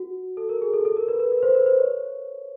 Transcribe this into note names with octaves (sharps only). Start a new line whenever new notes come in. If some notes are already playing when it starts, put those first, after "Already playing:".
Already playing: F#4
A4
A#4
G#4
A4
A4
A#4
B4
B4
B4
C5
B4
C5
C#5